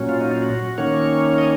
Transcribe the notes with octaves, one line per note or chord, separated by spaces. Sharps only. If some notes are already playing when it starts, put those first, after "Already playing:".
Already playing: A#2 F#3 C#4
F4
D#4
F4
F#4
D#3 A#3 C#4 C#5
D#5